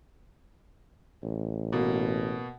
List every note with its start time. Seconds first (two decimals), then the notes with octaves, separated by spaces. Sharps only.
1.23 A1
1.72 B2 A#3